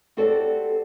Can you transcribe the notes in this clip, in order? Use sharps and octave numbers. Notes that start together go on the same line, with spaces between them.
C4 F#4 G4 A4 C5 D5